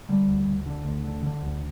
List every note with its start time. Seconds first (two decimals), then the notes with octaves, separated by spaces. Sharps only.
0.09 D3 G3
0.28 D2
0.47 D2
0.66 D3
0.85 D2
1.04 D3
1.23 D3
1.42 D2